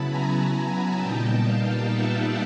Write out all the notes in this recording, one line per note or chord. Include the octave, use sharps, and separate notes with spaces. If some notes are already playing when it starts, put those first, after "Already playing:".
Already playing: C#3 F#3 B3 E4 A5 B5
G#5 A#5
A#2 G3 B3 D#4 G5 A5
F5 G5
E5 F#5